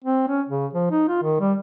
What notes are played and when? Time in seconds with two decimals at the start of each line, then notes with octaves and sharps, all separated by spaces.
0.04 C4
0.28 C#4
0.49 C#3
0.74 F3
0.91 D#4
1.08 F4
1.23 D#3
1.40 G3